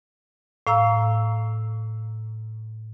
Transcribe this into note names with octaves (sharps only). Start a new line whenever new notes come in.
A2 F5 A#5 E6